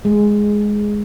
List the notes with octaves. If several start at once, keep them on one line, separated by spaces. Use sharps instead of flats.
G#3